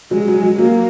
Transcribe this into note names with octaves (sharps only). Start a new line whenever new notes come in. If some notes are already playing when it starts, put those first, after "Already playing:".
F#3 G#3
F#3
F#3
F#3 A#3